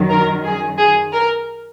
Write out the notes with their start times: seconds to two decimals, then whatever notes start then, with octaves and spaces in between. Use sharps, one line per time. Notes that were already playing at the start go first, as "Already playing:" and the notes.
Already playing: F#2 D#3 F#3
0.10 A#4
0.44 G#4
0.78 G#4
1.12 A#4